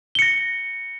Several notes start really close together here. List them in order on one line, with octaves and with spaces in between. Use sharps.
G7 C#7 A#6